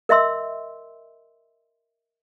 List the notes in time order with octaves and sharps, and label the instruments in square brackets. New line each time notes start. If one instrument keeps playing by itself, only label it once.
[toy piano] A#4 D#5 E5 C6 E6